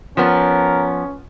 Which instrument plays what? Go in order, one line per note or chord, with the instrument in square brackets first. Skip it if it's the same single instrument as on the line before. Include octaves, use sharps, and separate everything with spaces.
[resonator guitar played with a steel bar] F3 B3 [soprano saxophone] C#4 [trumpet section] A#4